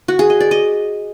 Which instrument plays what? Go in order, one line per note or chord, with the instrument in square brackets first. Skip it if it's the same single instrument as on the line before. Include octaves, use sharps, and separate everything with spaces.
[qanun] F#4
G#4
D#5
D5
D#5